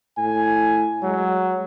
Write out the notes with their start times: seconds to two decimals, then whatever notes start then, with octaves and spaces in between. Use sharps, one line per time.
0.18 A2 G#5
1.03 F#3 G#3